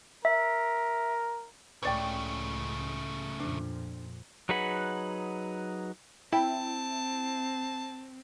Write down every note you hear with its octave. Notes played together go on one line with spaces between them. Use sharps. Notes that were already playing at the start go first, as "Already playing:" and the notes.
A#4 E5
C#2 A2 C#3 A3 C#5 D5 G5
F2 A#2 D4
F#3 D#4 G#4 B4 F#5
C4 E4 G5 A5